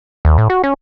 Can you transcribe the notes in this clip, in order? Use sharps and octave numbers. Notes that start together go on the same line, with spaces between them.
D#2
A2
F#4
C#4